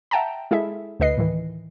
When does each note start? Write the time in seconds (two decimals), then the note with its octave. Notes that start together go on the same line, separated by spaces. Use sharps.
0.11 E5 F#5 G5 A5 A#5
0.51 G#3 E4 G#4 A4 E5
1.00 D2 D3 B4 D#5 C7
1.18 A2 D#3 E3